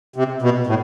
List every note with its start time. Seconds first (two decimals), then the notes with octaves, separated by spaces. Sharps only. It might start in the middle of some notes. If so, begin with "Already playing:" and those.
0.16 C3
0.42 B2
0.67 A2